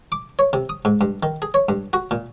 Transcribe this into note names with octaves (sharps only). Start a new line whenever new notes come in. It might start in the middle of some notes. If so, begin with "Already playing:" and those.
D6
C#5
C3
D#6
G#2
G2
D#3
G#4
C#5
G2
F#4
A#2